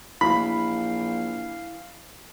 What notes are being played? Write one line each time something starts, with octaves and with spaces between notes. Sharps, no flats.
A#1 E3 F5 B5